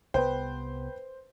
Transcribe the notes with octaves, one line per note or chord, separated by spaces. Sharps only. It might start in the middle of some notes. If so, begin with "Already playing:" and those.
C2 B3 B4 C5 G5